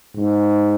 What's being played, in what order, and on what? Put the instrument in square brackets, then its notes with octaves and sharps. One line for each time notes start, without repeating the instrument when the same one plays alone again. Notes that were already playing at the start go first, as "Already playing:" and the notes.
[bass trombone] G#2